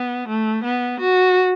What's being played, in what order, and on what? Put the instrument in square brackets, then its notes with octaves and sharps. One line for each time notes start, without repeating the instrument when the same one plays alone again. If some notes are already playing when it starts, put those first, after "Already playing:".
Already playing: [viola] B3
A3
B3
F#4